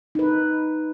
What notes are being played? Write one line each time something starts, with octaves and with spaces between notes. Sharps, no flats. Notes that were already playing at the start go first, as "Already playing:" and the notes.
D#4 B4